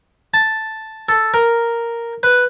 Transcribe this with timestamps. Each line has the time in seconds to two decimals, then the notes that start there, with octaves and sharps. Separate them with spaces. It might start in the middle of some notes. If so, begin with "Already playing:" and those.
0.34 A5
1.09 A4
1.34 A#4
2.23 B4